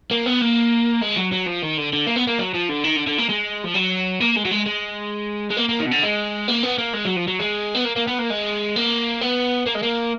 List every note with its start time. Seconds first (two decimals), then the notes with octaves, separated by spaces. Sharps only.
0.11 A#3
0.26 B3
0.41 A#3
1.02 G#3
1.17 F#3
1.32 F#3
1.47 F3
1.63 D#3
1.78 D3
1.93 D3
2.07 A#3
2.16 B3
2.27 A#3
2.38 F#3
2.54 F3
2.69 D3
2.84 D#3
2.96 D3
3.07 D3
3.18 A#3
3.29 G#3
3.65 F3
3.75 F#3
4.21 A#3
4.36 G#3
4.45 F#3
4.51 G#3
4.66 G#3
5.50 G#3
5.57 A#3
5.69 A#3
5.80 D#3
5.86 B2
5.91 D3
6.03 G#3
6.48 A#3
6.63 B3
6.78 A#3
6.93 G#3
7.05 F#3
7.16 F3
7.28 F#3
7.39 G#3
7.75 B3
7.85 A#3
7.96 A#3
8.07 B3
8.19 A#3
8.30 G#3
8.76 A#3
9.21 B3
9.66 A#3
9.75 G#3
9.83 A#3